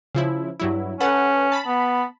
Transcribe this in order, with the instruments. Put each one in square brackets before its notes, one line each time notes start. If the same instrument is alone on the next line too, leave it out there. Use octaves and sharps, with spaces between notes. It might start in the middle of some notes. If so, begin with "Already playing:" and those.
[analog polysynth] C#3 F3 E4
G2 F#3 E4
[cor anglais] C#4 [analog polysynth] A4 B4 F#5
[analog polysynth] A5 B5
[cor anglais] B3